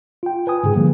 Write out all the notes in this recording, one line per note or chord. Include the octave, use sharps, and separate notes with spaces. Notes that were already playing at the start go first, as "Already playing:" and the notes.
F4 G5
B4 G#5 D#6
G#2 C#3 G#4
D3 F3 G3 A#3